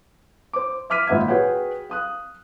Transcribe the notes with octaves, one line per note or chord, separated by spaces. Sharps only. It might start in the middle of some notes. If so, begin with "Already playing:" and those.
C5 D6
E5 D6 F6 B6 D#7
G#1 A#2 E5 F#5 G#6
F#4 G#4 B4 C#5 F#5 G5
F5 D#6 F#6